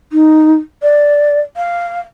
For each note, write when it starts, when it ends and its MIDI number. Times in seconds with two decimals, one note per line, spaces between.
0.12 0.55 63
0.82 1.39 74
1.56 2.00 77